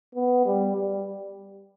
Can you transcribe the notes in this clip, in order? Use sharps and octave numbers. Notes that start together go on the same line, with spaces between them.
B3
G3
G3